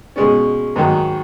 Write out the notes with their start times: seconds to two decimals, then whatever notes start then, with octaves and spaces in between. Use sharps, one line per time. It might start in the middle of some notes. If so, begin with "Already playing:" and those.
0.16 B2 G#3 C#4
0.76 G#2 D#3 F#3